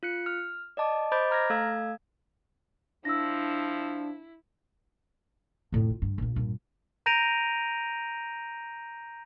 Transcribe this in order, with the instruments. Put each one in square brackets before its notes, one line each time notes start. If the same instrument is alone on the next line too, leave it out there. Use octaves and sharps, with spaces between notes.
[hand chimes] F4 F#6 C#7
F6
D5 D#5 A5 D6
C5 D#5 B5 D6 G6 A6
A#5 F6 G#6 A#6
A3 A4 F5 E6 G#6
[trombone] F3 [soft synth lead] D4 [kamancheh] E4 [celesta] E6 A#6
[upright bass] F2 A2
F4
G2
A#1 A#2
G2 A#2
[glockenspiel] A#5 G6 A#6 D7 D#7 F7